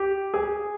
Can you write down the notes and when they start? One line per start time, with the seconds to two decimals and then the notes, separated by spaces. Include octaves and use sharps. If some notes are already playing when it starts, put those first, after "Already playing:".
Already playing: G4
0.34 G#4